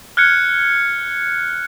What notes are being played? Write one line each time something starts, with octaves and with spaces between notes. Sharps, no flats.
F6 F#6 G#6 C#7